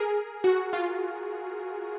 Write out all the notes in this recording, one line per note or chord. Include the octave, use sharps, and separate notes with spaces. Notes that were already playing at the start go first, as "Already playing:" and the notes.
Already playing: G#4 A#4
F#4
F4